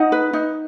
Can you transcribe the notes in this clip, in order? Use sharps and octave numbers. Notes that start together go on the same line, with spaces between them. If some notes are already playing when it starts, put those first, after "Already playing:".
Already playing: D#4 D#5 F#5
B4
D#4